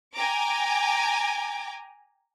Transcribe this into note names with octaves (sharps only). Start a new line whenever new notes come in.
G5 G#5 A#5 D6